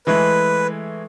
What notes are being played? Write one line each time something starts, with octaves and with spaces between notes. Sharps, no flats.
E3 G#3 A3 B4